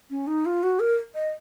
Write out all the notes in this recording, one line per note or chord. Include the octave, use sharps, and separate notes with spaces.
C#4
D#4
F4
F#4
A#4
D#5